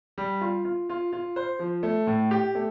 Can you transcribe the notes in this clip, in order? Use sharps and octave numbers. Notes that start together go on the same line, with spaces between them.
G3
F4
F4
F4
F4
C5
F3
A3
A2
G4
A3